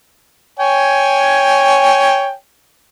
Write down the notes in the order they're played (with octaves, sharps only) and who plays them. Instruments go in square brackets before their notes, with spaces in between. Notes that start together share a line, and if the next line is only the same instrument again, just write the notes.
[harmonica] C#5 G5 G#5